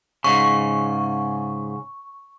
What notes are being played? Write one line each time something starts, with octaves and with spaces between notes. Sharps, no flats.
G#2 C#3 C#6